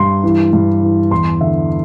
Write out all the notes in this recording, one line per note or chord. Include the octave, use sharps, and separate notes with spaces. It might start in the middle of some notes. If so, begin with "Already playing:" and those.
Already playing: G2 C6
E3
G2
E3
E2 C6
D3 E5